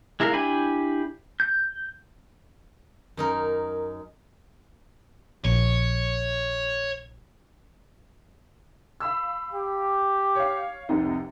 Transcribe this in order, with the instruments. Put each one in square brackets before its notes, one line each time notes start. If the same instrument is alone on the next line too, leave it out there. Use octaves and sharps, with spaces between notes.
[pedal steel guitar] G#3 E4 A#4 F5
D4 E4 G4 G#5 B5
G6
[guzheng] F#2 D#4 A#4
[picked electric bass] A#1 [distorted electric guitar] C#5
[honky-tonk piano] F5 B5 E6
[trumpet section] G4
[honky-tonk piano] C#5 F5
F1 C2 D#4